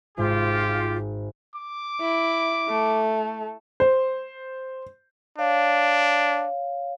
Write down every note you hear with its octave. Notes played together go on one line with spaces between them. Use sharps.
G#1 G#2 F4 G4
D6
E4
A3
C5
D4 C#5 F5